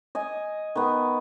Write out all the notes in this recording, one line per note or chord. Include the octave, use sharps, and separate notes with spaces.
D#5 G#5
D#3 B3